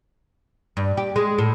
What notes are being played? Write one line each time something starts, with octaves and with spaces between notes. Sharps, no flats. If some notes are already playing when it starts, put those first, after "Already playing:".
G2
G4
G#3
A2